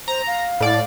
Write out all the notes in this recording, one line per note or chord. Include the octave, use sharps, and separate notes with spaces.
C5 A#5
F5
A2 D5